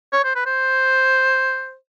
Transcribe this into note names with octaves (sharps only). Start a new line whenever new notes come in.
C#5
C5
B4
C5